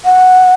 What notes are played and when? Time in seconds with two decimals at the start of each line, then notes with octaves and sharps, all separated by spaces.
0.05 F#5